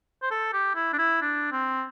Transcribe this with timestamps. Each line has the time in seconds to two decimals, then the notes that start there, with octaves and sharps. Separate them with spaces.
0.22 C5
0.31 A4
0.53 G4
0.75 E4
0.93 D4
0.98 E4
1.22 D4
1.52 C4